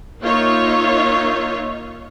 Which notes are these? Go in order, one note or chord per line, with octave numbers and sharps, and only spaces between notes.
A#3 D#4 F4 C#5 E5